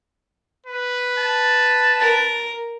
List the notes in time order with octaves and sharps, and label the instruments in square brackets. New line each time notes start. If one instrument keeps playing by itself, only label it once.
[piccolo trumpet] B4
[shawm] A5
[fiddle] A#4